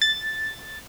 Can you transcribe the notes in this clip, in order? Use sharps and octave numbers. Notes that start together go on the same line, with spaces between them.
A6